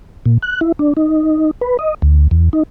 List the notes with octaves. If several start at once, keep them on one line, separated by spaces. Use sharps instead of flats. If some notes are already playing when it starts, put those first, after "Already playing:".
A#2
F#6
E4
D4
D#4
B4
D#5
D2
E2
D#4